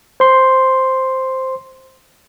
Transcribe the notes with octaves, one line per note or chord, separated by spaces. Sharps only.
C5 C6